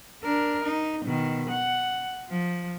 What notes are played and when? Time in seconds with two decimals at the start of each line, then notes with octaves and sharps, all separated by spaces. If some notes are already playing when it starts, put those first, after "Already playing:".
0.23 D4 A#4
0.64 D#4
1.05 B2 D#3
1.50 F#5
2.30 F3